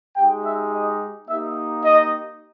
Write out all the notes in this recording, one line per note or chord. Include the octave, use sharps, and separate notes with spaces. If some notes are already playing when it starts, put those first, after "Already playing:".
G#3 D#4 G4 G5
E5
D#5
A#3 D#4 G4 E5
D#5